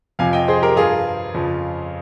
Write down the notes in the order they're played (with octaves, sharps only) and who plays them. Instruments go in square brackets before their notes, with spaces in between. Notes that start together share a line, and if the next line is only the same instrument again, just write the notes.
[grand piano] F2 C3 F3 F5 G#5
D#5 G5
G#4 C5
G4 A#4
G2 F3 F4 G#4
F2 C#3 F3